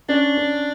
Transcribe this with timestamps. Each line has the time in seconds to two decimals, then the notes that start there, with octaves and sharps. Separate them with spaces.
0.09 C#4 D4
0.37 C#4